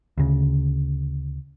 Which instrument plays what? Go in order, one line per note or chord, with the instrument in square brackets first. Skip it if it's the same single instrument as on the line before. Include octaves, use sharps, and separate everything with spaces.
[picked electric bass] D2 C#3